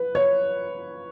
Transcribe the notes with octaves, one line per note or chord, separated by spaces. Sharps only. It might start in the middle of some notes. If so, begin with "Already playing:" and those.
Already playing: B4
C#5